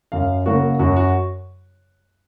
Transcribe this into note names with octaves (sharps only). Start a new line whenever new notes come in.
F#2 F5
C#3 F#3 A#3 F#4
F#2 F#4
F#4